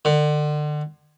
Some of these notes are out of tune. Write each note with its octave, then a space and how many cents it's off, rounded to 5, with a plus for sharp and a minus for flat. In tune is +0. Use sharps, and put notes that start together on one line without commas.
D3 +35